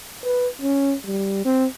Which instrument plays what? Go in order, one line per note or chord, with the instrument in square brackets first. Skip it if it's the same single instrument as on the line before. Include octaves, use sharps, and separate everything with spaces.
[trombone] B4
C#4
G3
C4